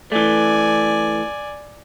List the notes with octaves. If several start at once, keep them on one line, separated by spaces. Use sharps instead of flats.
E3 A3 D5 G#5